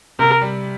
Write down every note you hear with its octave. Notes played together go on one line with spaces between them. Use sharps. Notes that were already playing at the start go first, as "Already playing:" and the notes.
C3 A#4
G3